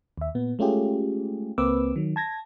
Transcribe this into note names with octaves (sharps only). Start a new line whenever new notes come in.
D#2 E5
A#2 B3
G#3 A3 C#4 F4 G4 G#4
C#2 A#3 C4 B4 D6 E6
D#3 F#3
A5 G#6 A#6